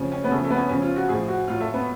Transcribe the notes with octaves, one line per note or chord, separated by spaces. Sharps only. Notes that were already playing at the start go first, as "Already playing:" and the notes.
Already playing: C#3 F3 C#4
C#4
B3
C#3 F3 A3
A3
B3
C#4
C#3 F3 C#4
F4
F#4
A2 F3 G#4
F#4
A2 F#3 F4
A3
B3